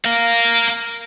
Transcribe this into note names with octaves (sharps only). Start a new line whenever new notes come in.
A#4 F5